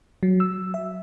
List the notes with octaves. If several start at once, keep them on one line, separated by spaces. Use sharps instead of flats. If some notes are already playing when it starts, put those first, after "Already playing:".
F#3
E6
E5